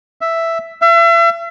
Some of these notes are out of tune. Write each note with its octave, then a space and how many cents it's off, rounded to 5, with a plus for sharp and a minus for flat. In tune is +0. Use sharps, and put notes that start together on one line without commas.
E5 +5
E5 +40